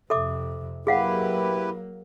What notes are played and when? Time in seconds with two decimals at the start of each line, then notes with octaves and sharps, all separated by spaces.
0.10 F2 C3 A4 E5 D6
0.87 F#3 A#3 E4 G4 G#4 B4 F5 F#5